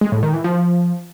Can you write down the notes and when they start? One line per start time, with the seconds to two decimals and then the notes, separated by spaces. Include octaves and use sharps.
0.01 G#3
0.12 A2
0.23 D#3
0.34 E3
0.44 F3